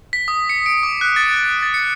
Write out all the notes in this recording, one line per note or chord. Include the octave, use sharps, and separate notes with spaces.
B6
D#6
C#7
D7
D6
F#6
A6
A6
A6
C#7